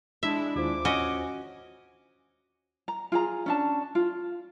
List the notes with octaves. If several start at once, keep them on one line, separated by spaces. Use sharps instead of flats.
G#3 D4 E4 E5
D#2 F4 C5 D6
C#4 F#4 D#5 G#5
A#5
F4 G#4 A#5
C#4 D4 A5
F4